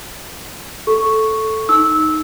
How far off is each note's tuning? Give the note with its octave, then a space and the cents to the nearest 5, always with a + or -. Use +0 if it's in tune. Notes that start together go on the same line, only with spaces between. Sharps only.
A4 -5 C#6 +0
D#4 +0 E6 -15